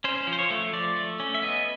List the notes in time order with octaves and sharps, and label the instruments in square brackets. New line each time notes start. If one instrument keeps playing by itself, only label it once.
[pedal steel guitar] C#4 C5
F3
C5
C#5
A3
F3 D5
A3
C#4
E5
B3 D#5